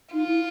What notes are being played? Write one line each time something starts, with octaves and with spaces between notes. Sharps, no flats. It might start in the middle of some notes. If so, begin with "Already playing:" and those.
D#4 F4
E4